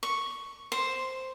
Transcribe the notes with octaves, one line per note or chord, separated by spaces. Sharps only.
C#6
C5